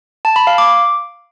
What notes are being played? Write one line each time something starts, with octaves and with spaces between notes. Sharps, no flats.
A5
B5
F5
D6